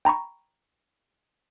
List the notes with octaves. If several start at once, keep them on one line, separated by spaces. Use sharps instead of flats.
G5 A#5 B5 C#6